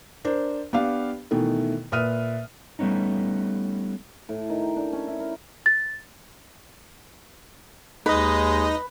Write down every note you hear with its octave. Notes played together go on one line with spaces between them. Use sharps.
D4 A#4 C5
B3 D4 G4 F5
B2 D#3 E3 A3
A#2 B4 E5 D#6 F6 D#7
G3 A3 B3 C#4 D#4
A2
D#3
G5
D4
C#4
E4
A#4
A6
D#2 G#3 D#4 B4 D#5